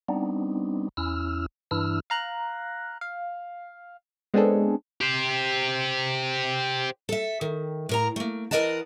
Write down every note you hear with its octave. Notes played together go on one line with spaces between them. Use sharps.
G3 B3 C4 D4 D#4
E2 C#4 E4 E6 F6
G2 E3 D4 E4 E6 F6
F5 A#5 F#6
F5
G#3 B3 C4 D4 G#4 A4
G4 C5
A4 E5
D#3
A2 A#4 A#5
A3 A#3
E3 A#4 D5 D#5 F#5 A5